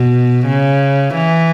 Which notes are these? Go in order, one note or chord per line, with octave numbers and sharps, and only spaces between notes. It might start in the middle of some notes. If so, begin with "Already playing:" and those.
Already playing: B2
C#3
E3